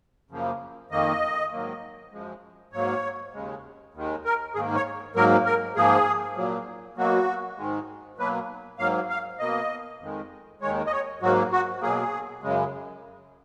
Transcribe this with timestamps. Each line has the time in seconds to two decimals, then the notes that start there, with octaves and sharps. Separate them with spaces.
0.31 F#2 C#3 F3 A#3
0.91 F2 D#3 A#3 D#5
1.52 G#2 D#3 F#3 A#3
2.12 F#2 F3 G#3
2.72 G#2 F#3 A#3 C#5
3.34 D#2 C#3 G#3
3.94 D#2 D#3 G#3
4.25 A#4
4.54 G#2 D#3 A#3 G#4
4.75 C#5
5.16 G#2 F#3 A#3 A#4
5.45 A#4
5.76 G#2 F3 A#3 G#4
6.37 A#2 F#3 A#3
6.97 B2 F#3 A#3 F#4
7.58 G#2 D#3 G#3
8.18 B2 F#3 A#3 B4
8.79 G#2 F#3 A#3 F5
9.10 F5
9.39 B2 A#3 D#5
10.00 F2 D#3 G#3
10.61 D#2 D#3 G#3 C#5
10.86 D#5
10.92 C#5
11.22 G#2 F#3 A#3 F#4
11.52 F#4
11.82 B2 F#3 A#3 G#4
12.43 F#2 C#3 G#3